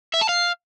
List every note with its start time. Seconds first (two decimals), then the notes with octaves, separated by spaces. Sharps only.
0.14 E5
0.21 A5
0.29 F5